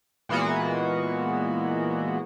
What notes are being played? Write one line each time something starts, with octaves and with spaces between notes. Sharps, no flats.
A#2 E3 G#3 A#3 B3 F#4